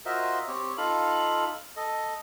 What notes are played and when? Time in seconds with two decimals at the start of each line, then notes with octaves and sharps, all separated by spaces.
0.05 F4 F#4 A#4 C5 D#5 E5
0.48 C4 G4 C#5
0.77 D#4 F4 A4 F5 B5
1.76 A4 D#5